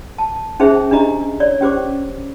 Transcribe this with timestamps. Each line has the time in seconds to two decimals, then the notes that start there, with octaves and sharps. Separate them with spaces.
0.18 A5
0.60 C#4 D#4 G#4 C5 E5
0.91 D4 D#4 G4 D#5 A#5
1.40 C#5 D5
1.61 C#4 G4 C5 D6